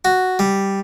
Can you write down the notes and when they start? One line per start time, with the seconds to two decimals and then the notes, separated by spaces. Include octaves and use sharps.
0.05 F#4
0.39 G3